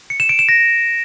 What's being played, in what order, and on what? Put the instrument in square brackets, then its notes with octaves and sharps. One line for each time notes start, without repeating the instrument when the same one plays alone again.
[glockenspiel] C#7
E7
D7
E7
A#6